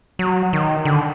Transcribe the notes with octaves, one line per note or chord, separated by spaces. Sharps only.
F#3
D#3
D3